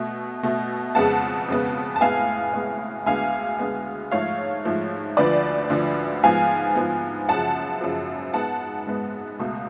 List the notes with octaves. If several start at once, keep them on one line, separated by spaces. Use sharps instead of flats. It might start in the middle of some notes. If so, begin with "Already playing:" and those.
Already playing: B2 A3
B2 A3
F2 C#3 G#3 B3 F#5 A5
F2 C#3 G#3 B3
A5
A2 G#3 B3 F5 G#5
A2 G#3 B3
D2 D3 G#3 B3 F5 G#5
D2 D3 G#3 B3
G#2 F3 A3 C#5 F5
G#2 F3 A3
D2 D3 F3 B4 D5
D2 D3 F3
G#2 F3 B3 F5 G#5
G#2 F3 B3
F#2 C#3 F3 F#5 A5
F#2 C#3 F3
G#2 G#3 B3 F#5 A5
G#2 G#3 B3
C#2 B2 A3